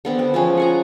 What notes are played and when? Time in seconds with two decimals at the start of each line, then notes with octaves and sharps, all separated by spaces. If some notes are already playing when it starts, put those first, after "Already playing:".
0.05 D3 B3 C4
0.19 C4
0.34 F3 G#3 C#4
0.57 F#5 G#5 A#5